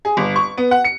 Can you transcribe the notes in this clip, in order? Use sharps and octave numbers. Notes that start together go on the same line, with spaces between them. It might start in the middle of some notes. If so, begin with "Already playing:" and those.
G#4
G1
C#6
B3
F#5
C#7